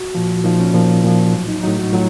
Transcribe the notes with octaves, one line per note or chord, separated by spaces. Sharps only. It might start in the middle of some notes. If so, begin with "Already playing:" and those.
Already playing: F#4
A#2 F3
A#2 F3 D#4
C#4
A#2 F3
A#2 F3
A2 F#3
D#4
A2 F#3 D#4
F#4
A2 F#3 F4